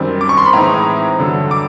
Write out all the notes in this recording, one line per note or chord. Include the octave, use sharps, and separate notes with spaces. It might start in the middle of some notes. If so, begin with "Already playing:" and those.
Already playing: F#2 D#3 G3 C4
D6
C#6
C6
B5
A2 E3 G#3 C4 D#4 A#5
G2 D3 F#3
D6